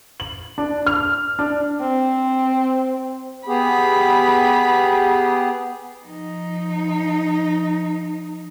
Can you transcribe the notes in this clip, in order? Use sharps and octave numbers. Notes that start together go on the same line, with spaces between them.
F#7
D4
F6
D4
C4
B3 G4 G#4 B5
F3 D#4